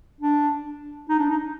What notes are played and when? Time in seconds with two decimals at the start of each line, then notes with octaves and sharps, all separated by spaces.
0.21 D4
1.09 D#4
1.19 D4
1.29 D#4